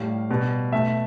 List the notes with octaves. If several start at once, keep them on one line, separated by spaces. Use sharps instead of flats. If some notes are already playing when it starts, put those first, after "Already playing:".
Already playing: A2 G3 F5
B2 G3
B2 A3 E5